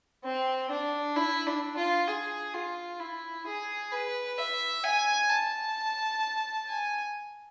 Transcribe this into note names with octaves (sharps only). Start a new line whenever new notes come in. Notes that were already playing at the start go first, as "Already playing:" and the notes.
C4
D4
E4
D4
F4
G#4
F4
E4
G#4
B4
E5
G#5
A5
G#5